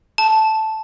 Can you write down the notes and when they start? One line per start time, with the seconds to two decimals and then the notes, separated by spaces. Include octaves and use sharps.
0.18 A5